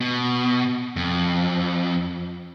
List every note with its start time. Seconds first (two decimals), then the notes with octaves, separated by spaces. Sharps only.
0.01 B2
0.96 F2